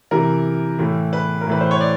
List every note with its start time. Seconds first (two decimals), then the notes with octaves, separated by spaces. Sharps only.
0.11 C3 E3 A#4
0.79 A2 E3
1.13 B4
1.41 A#4
1.47 A2 E3 B4
1.61 C5
1.71 C#5
1.80 D5